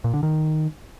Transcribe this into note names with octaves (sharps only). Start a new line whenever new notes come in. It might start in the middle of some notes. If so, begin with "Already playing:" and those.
A#2
D3
D#3